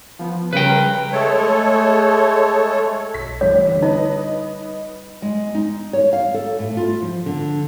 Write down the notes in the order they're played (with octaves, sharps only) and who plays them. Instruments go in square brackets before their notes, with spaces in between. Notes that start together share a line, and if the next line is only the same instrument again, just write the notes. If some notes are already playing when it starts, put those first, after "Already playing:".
[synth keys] F3 B3
[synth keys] C#3 G3 A#4 [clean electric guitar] B4 G5
[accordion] G#3 A3 A4 C#5
[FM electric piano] B1 [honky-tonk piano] B6
[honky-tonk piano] A1 [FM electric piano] G3 [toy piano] C#5
[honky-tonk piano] D3
[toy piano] D#4 [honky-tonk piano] B4 D#5
[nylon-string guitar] G#3
D#4
C#5
F5
A4
A2
F4
F3
D3